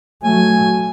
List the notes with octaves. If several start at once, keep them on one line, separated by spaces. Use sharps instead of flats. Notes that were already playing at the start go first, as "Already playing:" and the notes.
F#3 A3 G#5